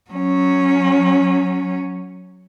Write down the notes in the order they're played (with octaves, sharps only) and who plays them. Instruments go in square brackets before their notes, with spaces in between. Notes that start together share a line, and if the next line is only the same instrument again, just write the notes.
[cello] F#3 C#4